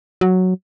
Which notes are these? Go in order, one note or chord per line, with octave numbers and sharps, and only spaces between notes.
F#3